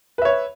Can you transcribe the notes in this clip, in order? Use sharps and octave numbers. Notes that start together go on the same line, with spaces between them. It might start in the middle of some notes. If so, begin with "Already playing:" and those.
B4 C#5 E5